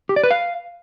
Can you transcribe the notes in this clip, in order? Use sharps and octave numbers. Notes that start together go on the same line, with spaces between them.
G4
D5
B4
F5